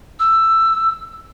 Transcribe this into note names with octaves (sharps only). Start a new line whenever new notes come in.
E6